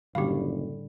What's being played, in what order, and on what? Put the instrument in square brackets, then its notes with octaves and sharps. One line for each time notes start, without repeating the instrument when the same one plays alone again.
[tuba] F#1 [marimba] A2 B5 [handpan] D3 G3 [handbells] G4 F5